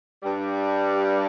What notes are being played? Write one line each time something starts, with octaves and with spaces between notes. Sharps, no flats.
G2 G3